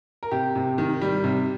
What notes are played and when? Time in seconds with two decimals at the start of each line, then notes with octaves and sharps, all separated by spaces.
0.23 A#4
0.31 C3 G4
0.55 C3
0.78 D#3
1.01 G3
1.24 C3